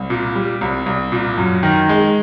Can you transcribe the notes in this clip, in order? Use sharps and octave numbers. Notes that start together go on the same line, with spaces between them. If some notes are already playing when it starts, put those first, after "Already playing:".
Already playing: C2
A#2
G3
C2
C2
A#2
F#2
D#3
G#3